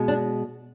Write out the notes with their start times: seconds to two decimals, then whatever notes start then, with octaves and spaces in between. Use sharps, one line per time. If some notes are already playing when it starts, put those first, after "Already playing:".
Already playing: B2 G#3
0.08 D4